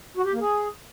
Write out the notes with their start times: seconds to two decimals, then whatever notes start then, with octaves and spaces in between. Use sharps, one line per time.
0.17 F#4
0.25 G4
0.33 A#3
0.40 G#4